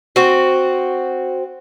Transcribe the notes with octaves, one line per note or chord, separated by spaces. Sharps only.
C4 F#4